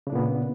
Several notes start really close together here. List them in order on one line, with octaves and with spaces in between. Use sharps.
C#3 D4 A#2 B3